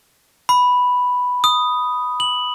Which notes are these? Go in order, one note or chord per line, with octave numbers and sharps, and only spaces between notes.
B5
D#6
F#7